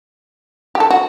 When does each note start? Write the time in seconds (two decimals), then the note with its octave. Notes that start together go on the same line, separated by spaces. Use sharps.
0.75 G4
0.80 A4
0.91 F#4